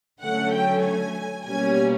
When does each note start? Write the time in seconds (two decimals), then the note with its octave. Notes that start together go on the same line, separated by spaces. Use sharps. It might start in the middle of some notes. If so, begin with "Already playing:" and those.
0.22 D3 F#3 A3 C#4 F#5
0.53 G5
0.84 G#5
1.46 B2 G3 A#3 C#4 G#5